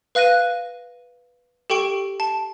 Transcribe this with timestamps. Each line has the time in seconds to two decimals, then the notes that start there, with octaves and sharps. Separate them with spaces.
0.15 B4 F5 F#6 A#6 D#7
1.70 G4 A4 G5 C#6 D7
2.20 A5